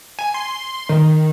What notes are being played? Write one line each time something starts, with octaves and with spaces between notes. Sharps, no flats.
G#5
C6
D#3